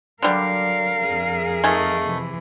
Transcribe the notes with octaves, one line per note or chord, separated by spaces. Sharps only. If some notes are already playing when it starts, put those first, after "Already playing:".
D3 F#3 G3 A#4 F5
F2 G#4
D#3 A3 G#5
C3 E3